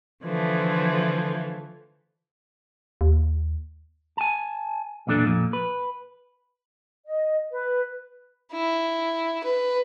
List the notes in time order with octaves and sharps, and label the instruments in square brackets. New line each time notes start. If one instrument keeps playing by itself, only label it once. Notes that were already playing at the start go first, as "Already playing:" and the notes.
[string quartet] D3 E3 F3 A3
[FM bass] D#2
[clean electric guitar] G#5 A5
B1 E2 A#2 D4 A4
F2 A#2
B4
[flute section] D#5
B4
[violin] E4
B4